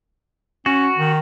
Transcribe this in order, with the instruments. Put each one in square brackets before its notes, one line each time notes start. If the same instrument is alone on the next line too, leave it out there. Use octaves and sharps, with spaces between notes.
[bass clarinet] C#4 [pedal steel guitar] F#4
[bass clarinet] D#3